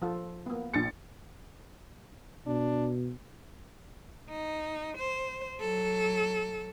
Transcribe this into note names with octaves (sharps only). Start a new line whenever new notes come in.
F3 F4 A4
A#3 B3
A#1 A6 C#7
B2 D4
D#4
C5
F#3 A4